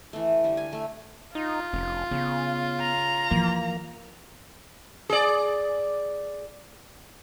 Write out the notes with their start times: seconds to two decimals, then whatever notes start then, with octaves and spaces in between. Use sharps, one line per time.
0.13 E3 A3
0.44 D3 G3
0.57 G#5
0.73 A3
1.35 D#4 F4
1.73 F1 C#4
2.11 C#3 B3
2.80 A#5
3.31 E3 F3 A#3
5.10 G#4 D5